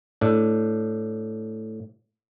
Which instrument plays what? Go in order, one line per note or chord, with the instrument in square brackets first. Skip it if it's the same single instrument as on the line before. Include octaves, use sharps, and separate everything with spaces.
[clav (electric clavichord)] A2 D4